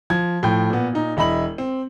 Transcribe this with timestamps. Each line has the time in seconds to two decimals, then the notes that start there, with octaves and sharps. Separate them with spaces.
0.10 F3 G#6
0.43 A2 F3 G5 G6
0.70 A#2 B3
0.92 A#2 D#4
1.17 E1 E4 D#5 B5 F#7
1.58 C4